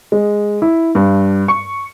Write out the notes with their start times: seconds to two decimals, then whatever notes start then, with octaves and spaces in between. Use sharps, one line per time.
0.12 G#3
0.62 E4
0.95 G2
1.48 C#6